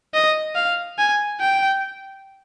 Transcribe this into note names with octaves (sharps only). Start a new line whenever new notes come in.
D#5
F5
G#5
G5